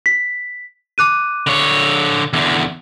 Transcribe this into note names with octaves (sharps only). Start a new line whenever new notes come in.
B6
D6 F#6 D#7
D3 C#5
E2 D3